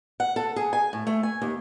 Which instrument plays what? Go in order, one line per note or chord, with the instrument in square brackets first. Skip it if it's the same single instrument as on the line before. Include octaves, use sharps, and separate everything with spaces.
[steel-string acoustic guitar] F#5
A4
G#4
G#5
A2
A3
G#5
D#2